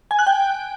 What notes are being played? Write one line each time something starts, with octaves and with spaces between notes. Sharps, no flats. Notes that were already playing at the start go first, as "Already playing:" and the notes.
G#5
F#6
G5